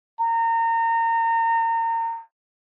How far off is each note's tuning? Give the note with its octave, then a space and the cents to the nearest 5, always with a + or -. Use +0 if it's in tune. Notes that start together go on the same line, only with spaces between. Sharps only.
A#5 -30